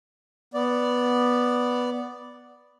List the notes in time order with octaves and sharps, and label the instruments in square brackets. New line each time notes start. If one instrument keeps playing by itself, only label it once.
[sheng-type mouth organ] B3 D5